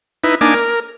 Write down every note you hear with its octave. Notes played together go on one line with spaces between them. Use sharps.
D#4 E4 B4
A#3 D4 D#4 G#5 D6
A#4